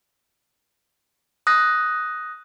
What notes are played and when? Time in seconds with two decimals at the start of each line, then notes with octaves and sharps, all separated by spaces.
1.47 D#6 F#6 A#6